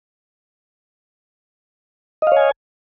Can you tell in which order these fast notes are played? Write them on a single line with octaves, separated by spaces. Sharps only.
D#5 F5 C#5 G#5